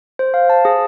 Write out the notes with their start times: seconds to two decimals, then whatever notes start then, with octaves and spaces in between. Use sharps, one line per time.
0.19 C5
0.34 F5
0.50 A5
0.65 G#4